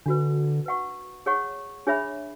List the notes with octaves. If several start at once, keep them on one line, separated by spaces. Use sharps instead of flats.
D3 D4 F#4 B4
B4 F#5 C#6
G#4 C#5 F#5 C#6
D4 G#4 C#5 E5 B5